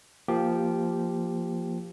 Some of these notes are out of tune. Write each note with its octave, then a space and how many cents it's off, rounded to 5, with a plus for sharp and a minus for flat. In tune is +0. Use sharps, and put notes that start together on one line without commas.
F3 -10 A#3 +0 G4 +0